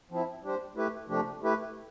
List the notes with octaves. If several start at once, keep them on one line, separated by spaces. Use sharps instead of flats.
F3 C4 E4
G3 D4 G4 C5
A3 E4 G4 B4
C3 F3 A3 D4 G4
A3 E4 G4 B4